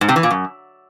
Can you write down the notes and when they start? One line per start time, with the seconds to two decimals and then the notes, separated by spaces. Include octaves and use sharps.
0.01 G#2
0.09 C3
0.16 E3
0.23 A#2
0.31 F#2